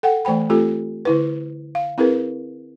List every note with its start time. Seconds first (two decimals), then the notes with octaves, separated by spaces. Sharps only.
0.03 A4 F#5 G5
0.25 E3 A3 C5 G5 B5
0.50 A3 C4 F4 G4 A4
1.05 D3 E4 B4
1.75 F5
1.98 C4 E4 G#4 A#4 B4